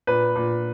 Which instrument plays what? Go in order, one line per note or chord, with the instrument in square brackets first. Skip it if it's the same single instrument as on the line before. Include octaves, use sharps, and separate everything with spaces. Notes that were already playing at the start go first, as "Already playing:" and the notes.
[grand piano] A#2 B4
A#2